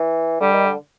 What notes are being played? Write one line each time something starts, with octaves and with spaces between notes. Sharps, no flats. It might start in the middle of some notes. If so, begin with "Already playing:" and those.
Already playing: E3
D3 G3
D#3
D3